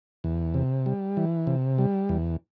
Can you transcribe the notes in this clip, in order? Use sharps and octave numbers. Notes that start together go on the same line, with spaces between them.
E2
C3
G3
E3
C3
G3
E2